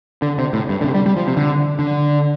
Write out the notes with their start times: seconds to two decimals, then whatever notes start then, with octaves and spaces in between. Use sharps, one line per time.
0.22 D3
0.38 C3
0.53 A2
0.69 G2
0.81 D3
0.84 C3
0.95 G3
1.06 G3
1.16 F3
1.27 C3
1.37 D3
1.79 D3